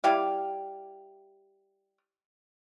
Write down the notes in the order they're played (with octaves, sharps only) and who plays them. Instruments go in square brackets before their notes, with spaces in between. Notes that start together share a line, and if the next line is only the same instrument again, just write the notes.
[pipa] G3 E4 G4 F5